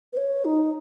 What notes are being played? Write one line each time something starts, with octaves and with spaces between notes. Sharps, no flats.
B4
C#5
D#4